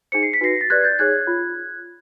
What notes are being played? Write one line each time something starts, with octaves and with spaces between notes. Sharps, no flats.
D#4 G#4 C5 C#7
C7
B6
D#4 F#4 B4 A#6 C7
A6
G4 B4 D5 F#6 G#6
G6 A6
D#4 G#4 C#5 F#6 G#6
F4